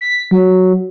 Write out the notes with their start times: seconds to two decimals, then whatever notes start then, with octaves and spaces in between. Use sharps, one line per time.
0.01 B6
0.31 F#3